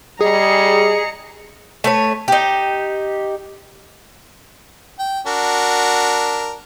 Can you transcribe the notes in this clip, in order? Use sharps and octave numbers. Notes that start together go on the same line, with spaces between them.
G3 G#4 D#5 A#5 C#7
A3 B4 C#5
D#4 G4
G5
D4 F#4 A#4